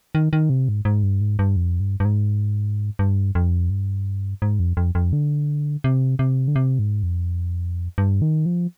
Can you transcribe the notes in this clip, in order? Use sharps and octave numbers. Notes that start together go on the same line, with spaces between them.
D#3
D#3
C3
G#2
G#2
G2
G#2
G2
F2
G2
G2
G#2
G2
F2
G2
G#2
F2
F2
F2
D3
C3
C3
D3
C3
G#2
F2
G2
D#3
F3